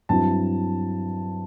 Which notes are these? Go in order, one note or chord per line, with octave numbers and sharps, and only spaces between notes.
G2 F#3 C4 E4 A5